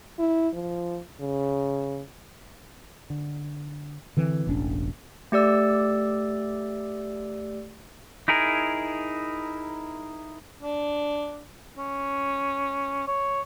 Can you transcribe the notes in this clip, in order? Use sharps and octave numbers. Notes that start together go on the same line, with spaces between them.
E4
F3
C#3
D3
D3 E3 C4
E1 A1 C#4 D4
A3 G4 D5 E6
D#4 E4 G#4 A#4
D4
C#4
C#5